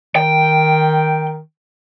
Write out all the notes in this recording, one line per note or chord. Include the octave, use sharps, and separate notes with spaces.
D#3 G5